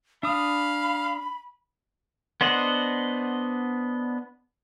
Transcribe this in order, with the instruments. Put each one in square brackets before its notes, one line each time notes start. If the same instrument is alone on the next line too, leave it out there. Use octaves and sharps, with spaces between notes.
[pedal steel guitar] D4 D#6 [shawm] F5 [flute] B5
[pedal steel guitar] B3 D4 C5 D#5 F#5